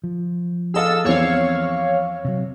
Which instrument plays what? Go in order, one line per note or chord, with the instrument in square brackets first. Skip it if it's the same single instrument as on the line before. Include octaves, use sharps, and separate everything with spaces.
[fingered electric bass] F3
[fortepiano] G#4 D#5 F5 [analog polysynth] A4 E6
[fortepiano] E2 C4 [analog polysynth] C#5 F5
[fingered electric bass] C3 F#3